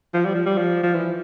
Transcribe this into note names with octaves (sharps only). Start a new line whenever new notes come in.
F3
G3
F3
G3
F3
F3
E3